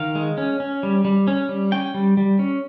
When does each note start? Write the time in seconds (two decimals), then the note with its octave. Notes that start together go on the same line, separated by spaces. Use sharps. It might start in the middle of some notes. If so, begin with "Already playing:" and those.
Already playing: D#3 F5
0.15 G#3
0.38 C#4
0.60 C#4
0.83 G3
1.05 G3
1.28 C#4
1.49 G3
1.72 C#4 G5
1.94 G3
2.17 G3
2.39 C#4